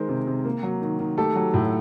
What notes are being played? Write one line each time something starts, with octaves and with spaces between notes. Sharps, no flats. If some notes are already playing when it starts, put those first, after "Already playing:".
Already playing: D#3 G#3 A#4 C5
C3
C3
A#3
F#3
D#3
D#3
A3 G4 A4
F#3
A2